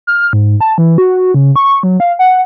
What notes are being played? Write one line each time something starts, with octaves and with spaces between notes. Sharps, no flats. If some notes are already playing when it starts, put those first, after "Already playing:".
F6
G#2
A5
E3
F#4
C#3
C#6
F#3
F5
F#5